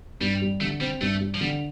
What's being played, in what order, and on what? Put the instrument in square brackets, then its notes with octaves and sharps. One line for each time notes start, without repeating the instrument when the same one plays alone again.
[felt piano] G2 [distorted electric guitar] G3
[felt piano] G3
[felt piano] D3 [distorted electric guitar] A3
[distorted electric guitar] G3 [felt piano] C4
[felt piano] G2 [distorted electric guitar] A3
[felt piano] G3
[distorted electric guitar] F3
[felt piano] D3 [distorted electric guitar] G3